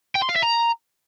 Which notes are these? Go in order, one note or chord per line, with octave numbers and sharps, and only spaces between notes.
G5
C6
F5
E5
A#5